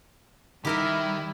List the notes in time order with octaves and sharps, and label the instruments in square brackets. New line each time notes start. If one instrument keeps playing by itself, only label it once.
[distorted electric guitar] D#3 [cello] G3 [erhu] E4 [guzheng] G4 A#4 E5